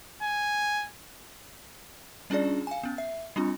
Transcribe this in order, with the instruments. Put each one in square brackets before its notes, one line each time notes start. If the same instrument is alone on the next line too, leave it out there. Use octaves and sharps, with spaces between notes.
[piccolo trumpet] G#5
[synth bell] G3 C#4 D4 F4 G#4 D5
F5 G#5
B3 C#4
E5
G3 C4 D4 F4